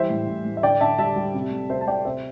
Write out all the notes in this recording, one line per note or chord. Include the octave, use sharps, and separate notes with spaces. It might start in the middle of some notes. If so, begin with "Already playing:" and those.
Already playing: E3 G3 C5 E5
A2
A2
A2
E5
D3 D5 G5
D3 E5 A5
G3 E5 A5
G3
C3
A3
C3 C5 E5
A5
A3 D5 G5
C3 C5 E5